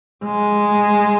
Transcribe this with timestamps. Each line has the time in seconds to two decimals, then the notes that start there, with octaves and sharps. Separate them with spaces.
0.25 G#3